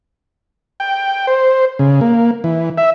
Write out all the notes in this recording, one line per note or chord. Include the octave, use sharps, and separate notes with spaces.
G5
C5
C#3
A#3
E3
E5